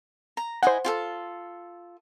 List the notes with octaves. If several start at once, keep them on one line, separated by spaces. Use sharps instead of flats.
A#5
E4 C5 D#5 F#5 G#5
F4 G4 A4